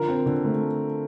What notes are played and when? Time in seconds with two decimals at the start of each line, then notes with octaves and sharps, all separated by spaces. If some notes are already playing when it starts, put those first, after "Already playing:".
Already playing: D3 F3 A#4
0.08 C4
0.26 D3
0.45 A3